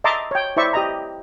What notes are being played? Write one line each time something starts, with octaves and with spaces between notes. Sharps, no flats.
D#5 E5 A5 A#5 C6 D6
C#5 G5
E4 C5 D5 E5 C#6
G4 D#5 A#5